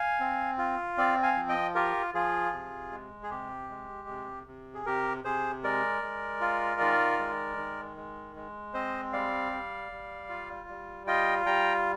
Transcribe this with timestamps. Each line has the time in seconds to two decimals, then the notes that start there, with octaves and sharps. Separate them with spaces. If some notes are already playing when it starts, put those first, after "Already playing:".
Already playing: F5 G#5
0.20 C4
0.58 F4
0.97 C4 D5 F5
1.23 F5 G#5
1.36 F3
1.49 D#5 G5
1.75 F4 G4 A#4
2.14 F3 F4 G#4
2.52 C3
2.91 G#3
3.23 G#4
3.30 C3 G4
3.70 G#3
4.08 C3
4.47 C3
4.74 G#4
4.86 C3 G4 A#4
5.24 C3 G#4 C5
5.63 G#3 A#4 D5
6.02 G#3
6.41 F4
6.81 D#3
7.19 G#3
7.57 D#3
7.97 G#3
8.36 G#3
8.74 C4 C5 D#5
9.13 G3 D5 F5
9.52 G3
9.91 G3
10.29 F4
10.68 G3
11.07 F4 D#5 G5
11.46 G3 G5 A#5